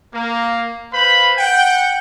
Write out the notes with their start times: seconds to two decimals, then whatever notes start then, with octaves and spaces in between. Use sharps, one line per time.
0.14 A#3
0.92 B4 C5 F5 B5
1.37 F#5 G5